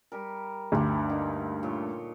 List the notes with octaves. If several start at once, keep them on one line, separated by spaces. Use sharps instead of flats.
G3 A#4
D2 G2 D#3 D4
D3 A#3 D#4
A#2 A4 C#5